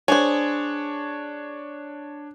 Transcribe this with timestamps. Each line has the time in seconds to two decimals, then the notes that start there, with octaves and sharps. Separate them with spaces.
0.08 D4 G#4 C5 C#5